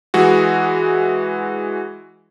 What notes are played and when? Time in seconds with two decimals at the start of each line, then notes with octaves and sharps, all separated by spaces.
0.14 E3 G#3 F#4